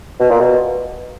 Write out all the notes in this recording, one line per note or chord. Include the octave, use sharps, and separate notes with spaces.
B2
A#2
B2